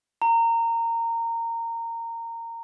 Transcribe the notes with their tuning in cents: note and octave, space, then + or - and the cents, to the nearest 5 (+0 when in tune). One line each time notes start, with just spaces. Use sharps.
A#5 -20